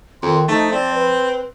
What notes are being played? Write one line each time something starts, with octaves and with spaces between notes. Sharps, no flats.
F2 D#3 C6
F3 A3 D#4
C4 D5
B4